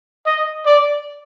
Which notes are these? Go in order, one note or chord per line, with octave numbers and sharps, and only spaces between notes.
D#5
D5